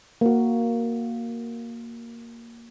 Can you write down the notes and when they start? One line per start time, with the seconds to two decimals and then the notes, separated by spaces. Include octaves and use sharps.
0.21 A#3 F#4